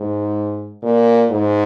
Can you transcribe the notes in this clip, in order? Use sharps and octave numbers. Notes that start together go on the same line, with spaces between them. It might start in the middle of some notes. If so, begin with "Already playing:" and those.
Already playing: G#2
A#2
G#2